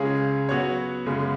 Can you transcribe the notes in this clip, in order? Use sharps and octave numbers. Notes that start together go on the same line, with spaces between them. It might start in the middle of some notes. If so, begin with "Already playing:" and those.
Already playing: C#2 C#3 G#3 C#4 G#4
F#3 B3 F#4 C#5
F#2 C#3 G#3 B3